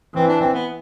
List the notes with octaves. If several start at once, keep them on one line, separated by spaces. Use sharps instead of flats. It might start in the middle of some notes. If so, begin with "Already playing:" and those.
E3 C4
D4
C4
B3